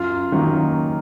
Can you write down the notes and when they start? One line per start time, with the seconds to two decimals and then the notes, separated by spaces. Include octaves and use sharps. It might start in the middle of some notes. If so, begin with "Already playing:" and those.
Already playing: F#2 F4
0.32 D#3 F#3 A#3 C#4